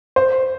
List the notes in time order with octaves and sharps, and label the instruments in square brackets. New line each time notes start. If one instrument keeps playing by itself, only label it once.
[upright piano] C5